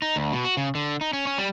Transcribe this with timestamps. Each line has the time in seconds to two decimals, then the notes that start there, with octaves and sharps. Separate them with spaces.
0.02 D#4
0.16 D2
0.33 B2
0.45 F#4
0.57 C#3
0.75 D3
1.01 D#4
1.13 C#4
1.27 C#4
1.38 G3